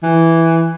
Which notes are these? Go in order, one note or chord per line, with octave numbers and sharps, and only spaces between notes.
E3